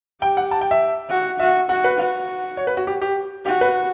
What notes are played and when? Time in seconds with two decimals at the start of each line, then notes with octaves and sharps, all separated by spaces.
0.22 G4 G5
0.37 F#5
0.51 A5
0.61 G5
0.71 E5
1.10 F#4
1.39 F#4 E5
1.69 F#4 F#5
1.84 B4
1.98 F#4
2.57 C#5
2.67 B4
2.77 F#4
2.87 G4
3.02 G4
3.46 F#4 G4
3.61 B4